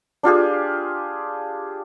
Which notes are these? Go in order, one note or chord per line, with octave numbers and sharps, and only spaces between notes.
D4 F4 G4 G#4